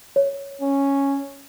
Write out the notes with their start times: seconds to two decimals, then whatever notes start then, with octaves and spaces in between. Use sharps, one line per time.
0.16 C#5
0.61 C#4